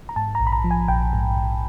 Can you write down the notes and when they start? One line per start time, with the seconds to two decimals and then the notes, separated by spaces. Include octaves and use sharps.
0.09 A#5
0.16 G#2 A5
0.35 A#5
0.40 A#1
0.47 B5
0.52 A#5
0.64 F3
0.71 G#5
0.88 A#1 G5
1.13 G#2
1.37 A#1